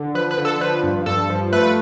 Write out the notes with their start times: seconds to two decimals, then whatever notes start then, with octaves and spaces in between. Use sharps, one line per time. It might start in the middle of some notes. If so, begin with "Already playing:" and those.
Already playing: D3
0.14 F3 B4
0.31 B4
0.38 D3
0.45 A4
0.61 F3 B4
0.83 G2
1.06 G2 A4
1.30 F3
1.53 A3 B4